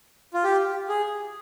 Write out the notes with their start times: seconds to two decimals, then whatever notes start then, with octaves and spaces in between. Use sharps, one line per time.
0.34 F4
0.44 G4
0.89 G#4